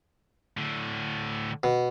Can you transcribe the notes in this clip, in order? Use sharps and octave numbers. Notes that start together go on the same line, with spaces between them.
A2 D3
B2